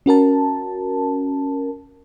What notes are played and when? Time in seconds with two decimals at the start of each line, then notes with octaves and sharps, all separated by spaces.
0.06 C#4 F#4 A#4 A5